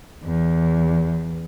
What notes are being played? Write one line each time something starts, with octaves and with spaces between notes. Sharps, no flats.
E2